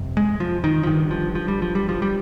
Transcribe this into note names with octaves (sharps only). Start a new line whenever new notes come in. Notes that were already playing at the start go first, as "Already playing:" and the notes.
Already playing: G1 F2 C3
G#3
F3
D#3
F3
G1 G2 D#3
F3
F3
G3
F3
G3
F3
G3